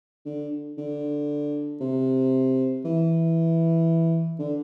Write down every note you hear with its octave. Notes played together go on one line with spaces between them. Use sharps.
D3
D3
C3
E3
D3